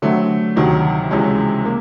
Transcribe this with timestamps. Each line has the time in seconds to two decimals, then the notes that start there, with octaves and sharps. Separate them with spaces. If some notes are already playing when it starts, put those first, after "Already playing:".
0.02 D3 F#3 A3 C4
0.56 D2 C3 D#3 F#3
1.11 C#2 C3 E3 G#3 C#4
1.66 A#3